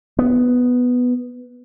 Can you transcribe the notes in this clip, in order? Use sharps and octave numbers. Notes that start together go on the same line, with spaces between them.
B3